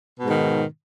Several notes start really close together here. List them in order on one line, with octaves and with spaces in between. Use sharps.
B2 G#2 D#3